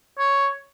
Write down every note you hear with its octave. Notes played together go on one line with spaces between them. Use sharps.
C#5